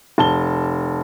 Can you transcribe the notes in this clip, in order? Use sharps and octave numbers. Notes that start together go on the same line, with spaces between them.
F1 A5 G7